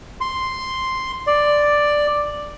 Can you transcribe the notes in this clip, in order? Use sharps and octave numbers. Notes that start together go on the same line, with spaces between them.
C6
D5